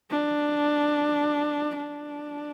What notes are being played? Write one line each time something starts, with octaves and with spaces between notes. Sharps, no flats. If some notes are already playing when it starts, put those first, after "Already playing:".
D4
D4